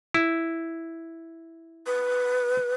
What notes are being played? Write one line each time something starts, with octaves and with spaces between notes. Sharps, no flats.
E4
B4